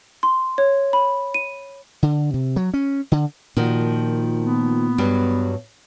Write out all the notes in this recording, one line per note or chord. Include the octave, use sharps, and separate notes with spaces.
C6
C#5
B5
D#7
D3
C3
F#3
C#4
D3
A#2 D#3 F3 F#4
B3
G2 F#3 G3